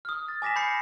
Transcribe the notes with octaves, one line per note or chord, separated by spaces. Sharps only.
D#6 F6
A6
G#5 D6 A#6 B6 E7
B5 G6 A#6 C7 C#7